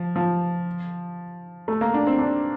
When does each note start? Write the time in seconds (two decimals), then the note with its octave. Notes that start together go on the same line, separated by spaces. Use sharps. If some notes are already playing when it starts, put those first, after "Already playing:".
Already playing: F3
0.16 F3
1.68 A3
1.81 A#3
1.94 D4
2.07 C4
2.19 D4